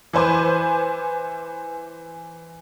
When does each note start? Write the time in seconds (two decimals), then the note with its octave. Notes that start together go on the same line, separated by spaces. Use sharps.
0.13 E3 B4 C5 G#5 D6